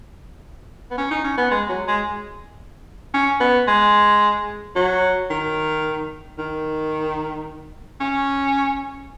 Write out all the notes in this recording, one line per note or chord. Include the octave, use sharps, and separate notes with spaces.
B3
C#4
D#4
C#4
B3
G#3
F#3
G#3
C#4
B3
G#3
F#3
D#3
D#3
C#4